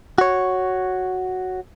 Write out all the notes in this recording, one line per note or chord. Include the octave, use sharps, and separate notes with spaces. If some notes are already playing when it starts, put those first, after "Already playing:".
F#4 C#5